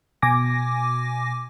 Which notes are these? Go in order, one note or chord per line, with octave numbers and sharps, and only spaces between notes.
B2 G#5 D6 A#6